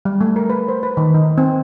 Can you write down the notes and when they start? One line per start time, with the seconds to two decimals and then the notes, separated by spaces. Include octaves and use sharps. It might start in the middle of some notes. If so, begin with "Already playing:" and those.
0.05 G3
0.21 A3
0.36 A#4
0.49 B4
0.68 C5
0.83 B4
0.97 D#3
1.14 D#4
1.38 C4